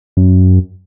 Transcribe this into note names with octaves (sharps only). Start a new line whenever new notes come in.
F#2